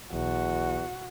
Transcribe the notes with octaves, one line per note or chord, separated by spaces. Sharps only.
B1 E2 F#4